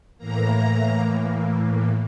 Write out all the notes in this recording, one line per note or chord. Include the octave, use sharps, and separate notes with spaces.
A2 E3 A#3 A#5